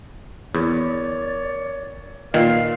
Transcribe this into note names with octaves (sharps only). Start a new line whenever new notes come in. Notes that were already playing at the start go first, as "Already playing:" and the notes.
E2 A#4 C#5 D5
A#2 D#3 F4 B4 F5